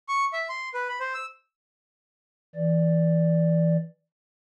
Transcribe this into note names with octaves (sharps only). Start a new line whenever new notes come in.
C#6
E5
C6
B4
B5
C5
E6
E3 D5